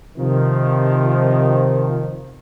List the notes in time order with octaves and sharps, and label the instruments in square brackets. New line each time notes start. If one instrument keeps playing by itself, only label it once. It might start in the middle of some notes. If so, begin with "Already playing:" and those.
[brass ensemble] C3 D#3 F3